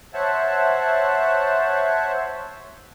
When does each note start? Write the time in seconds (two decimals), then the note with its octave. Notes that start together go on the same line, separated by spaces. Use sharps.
0.14 C5 C#5 E5 F#5 A5